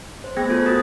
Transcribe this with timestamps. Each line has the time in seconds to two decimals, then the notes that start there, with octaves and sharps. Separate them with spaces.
0.24 C5
0.37 A3 B3 G#4 G5 G#6 A#6
0.49 F4 A4 C5
0.66 F#4 A#4 D#6 A6 A#6